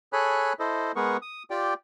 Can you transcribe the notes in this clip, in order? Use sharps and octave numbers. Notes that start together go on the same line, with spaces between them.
G#4 A4 C#5 G#5 B5 F#6
E4 A4 C5 D#5
G#3 B3 G#4 A#4 B4 C#6
D#6
F4 G4 D5 G5